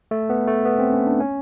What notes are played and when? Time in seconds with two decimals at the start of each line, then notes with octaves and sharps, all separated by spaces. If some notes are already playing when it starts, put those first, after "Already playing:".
0.11 A3
0.30 B3
0.48 A3
0.65 B3
0.79 C4
0.93 C#4
1.07 D4
1.20 C#4